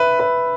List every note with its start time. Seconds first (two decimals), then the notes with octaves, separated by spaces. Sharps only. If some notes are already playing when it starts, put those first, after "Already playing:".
Already playing: B4 E5
0.20 B4